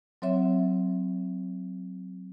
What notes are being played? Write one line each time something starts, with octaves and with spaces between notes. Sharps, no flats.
F#3 C4 C#5 E5